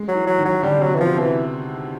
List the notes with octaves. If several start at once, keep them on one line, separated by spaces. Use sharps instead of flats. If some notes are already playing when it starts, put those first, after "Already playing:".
Already playing: G#3
F#3
E3
F#3
D#3
F#3
D3 G3
C3 F#3
B2
E3
B2 F3
C3
E3